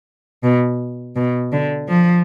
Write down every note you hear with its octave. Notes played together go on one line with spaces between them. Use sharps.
B2
B2
D3
F3